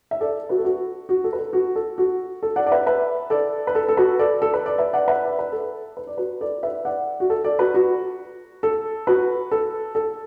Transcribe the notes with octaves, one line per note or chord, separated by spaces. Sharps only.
E5
A4 D5
F#4 B4
A4
F#4
F#4
A4
B4
A4
F#4
A4
F#4
A4
D5 F#5
D5
B4 E5
B4 E5
A4 D5
B4
A4
A4
F#4 B4
A4 D5
A4
B4
D5
B4 E5
D5 F#5
B4 E5
D5
B4
A4
B4
D5
F#4 B4
A4 D5
B4 E5
D5 F#5
F#4
A4
A4 D5
F#4 B4
F#4
A4
F#4 B4
A4
A4